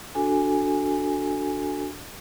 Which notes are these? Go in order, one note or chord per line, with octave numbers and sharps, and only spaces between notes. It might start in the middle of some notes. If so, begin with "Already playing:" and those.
D4 F#4 A4 G#5